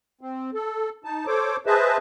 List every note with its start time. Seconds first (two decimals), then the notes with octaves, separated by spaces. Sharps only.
0.21 C4
0.54 A4
1.04 D#4 A5
1.27 A4 C5 C#5 D6
1.66 G#4 B4 C5 D#5 E5 A5